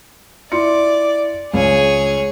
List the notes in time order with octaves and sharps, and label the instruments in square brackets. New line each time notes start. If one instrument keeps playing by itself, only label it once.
[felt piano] E4 C6 C#7 [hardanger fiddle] D5
[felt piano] C#2 [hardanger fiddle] G#4 C#5